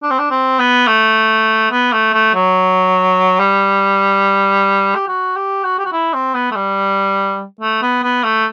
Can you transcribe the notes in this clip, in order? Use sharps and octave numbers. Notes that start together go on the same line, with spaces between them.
D4
C4
D4
C4
B3
A3
B3
A3
A3
F#3
G3
G4
F#4
G4
F#4
G4
F#4
E4
C4
B3
A3
G3
A3
B3
B3
A3